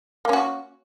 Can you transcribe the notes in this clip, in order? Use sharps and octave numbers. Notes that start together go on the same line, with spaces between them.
A#3 C#4 F#4